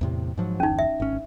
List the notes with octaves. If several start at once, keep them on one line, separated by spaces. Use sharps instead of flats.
E2 A2 C3
G#2 F3 F#3
G1 E2 C#4 D#4
E5
G#1 C#4